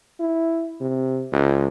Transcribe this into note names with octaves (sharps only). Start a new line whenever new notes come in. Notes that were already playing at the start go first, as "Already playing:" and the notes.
E4
C3
C#2